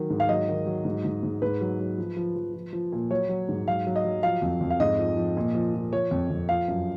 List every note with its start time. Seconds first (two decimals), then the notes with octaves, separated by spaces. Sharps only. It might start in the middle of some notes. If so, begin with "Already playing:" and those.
Already playing: D#3 F#3
0.10 G#2
0.20 F5
0.29 F#3 D#5
0.48 D#3
0.66 F#3
0.85 G#2
1.04 G#2
1.23 G#2
1.42 G#2 B4
1.61 F#3
1.80 F#3
1.98 F3
2.17 F3
2.36 F3
2.54 F3
2.73 F3
2.92 A#2
3.11 F#3 C#5
3.29 F#3
3.49 G#2
3.68 F#3 F5
3.87 F#3
3.96 D#5
4.05 F#3
4.23 F3 F5
4.42 F2
4.61 F2
4.70 F5
4.80 G#2 D#5
4.99 F3
5.17 F3
5.37 A#2
5.55 F3
5.74 F3
5.93 F3 C#5
6.11 F2
6.31 F2
6.49 F3 F5
6.68 F#2